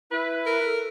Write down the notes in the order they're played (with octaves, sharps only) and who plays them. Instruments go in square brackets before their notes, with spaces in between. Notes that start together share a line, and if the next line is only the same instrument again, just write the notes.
[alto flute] E4 [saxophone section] B4
[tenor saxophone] A#4
[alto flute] A4